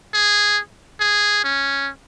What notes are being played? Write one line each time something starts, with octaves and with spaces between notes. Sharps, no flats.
G#4
G#4
C#4